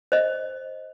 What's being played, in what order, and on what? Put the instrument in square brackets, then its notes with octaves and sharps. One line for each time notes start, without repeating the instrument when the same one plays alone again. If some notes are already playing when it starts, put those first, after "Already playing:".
[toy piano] C5 D#5